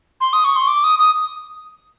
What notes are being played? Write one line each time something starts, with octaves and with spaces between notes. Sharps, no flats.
C6
D#6
C#6
C6
D6
D#6
D#6